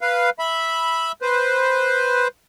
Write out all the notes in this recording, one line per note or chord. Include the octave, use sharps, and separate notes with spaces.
B4 F5
E5 B5
B4 C5